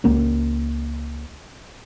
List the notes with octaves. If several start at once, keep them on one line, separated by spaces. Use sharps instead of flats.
C#2 A#3 C#4